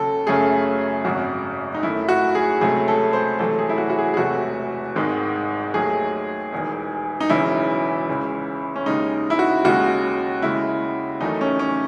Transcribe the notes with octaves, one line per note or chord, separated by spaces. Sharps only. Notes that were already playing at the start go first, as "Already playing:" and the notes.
Already playing: D#2 C#3 F#3 A4
F#2 C#3 F#3 A3 G#4
G#1 F#2 C#3 F#3 F#4
D#4
F#2 D#3 A3 E4
F#4
G#4
C#2 C3 F#3 A3 G#4
A4
C5
E1 E2 C3 F#3 A3 A4
G#4
E4
F#4
F#4
G#4
G#4
E1 E2 C3 F#3 A3 F#4
G#1 G#2 D#3 G#3
D#2 D#3 F#3 A3 G#4
E1 E2 D#3
D#4
E1 E2 C#3 F#3 E4
C#2 C#3 E3
C#4
D#2 C#3 G#3 D#4
E4
F#4
D#2 C#3 G#3 F#4
D#2 C#3 G#3 E4
E2 D#3 F#3 A3 D#4
C#4
C#4